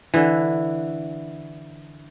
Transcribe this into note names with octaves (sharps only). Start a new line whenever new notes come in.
D3 E3